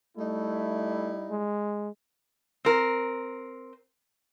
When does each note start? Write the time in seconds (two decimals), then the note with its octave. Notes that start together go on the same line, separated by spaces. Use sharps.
0.17 G3 A3 D#4 E4
1.30 G#3
2.65 C4 A#4